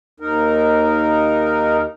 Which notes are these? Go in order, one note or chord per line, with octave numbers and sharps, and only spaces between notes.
D#2 D#4 A#4